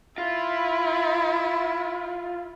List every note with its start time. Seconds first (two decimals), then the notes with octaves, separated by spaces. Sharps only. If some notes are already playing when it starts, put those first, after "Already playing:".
0.18 E4 F4